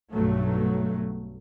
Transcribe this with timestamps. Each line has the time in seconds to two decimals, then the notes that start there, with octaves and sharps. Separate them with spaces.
0.11 B1 G2 F#3 A3